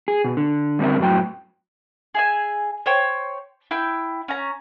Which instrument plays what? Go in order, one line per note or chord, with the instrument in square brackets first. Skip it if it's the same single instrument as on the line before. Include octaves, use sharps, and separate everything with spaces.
[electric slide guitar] G#4
B2
D3
D3 G3 C4 A#4 E5
F#2 A2 F#3 G5
[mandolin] G#4 E5 G#5
C5 C#5 G5
E4 G5 G6
C#4 A#5